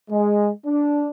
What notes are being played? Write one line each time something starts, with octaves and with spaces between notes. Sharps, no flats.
G#3
D4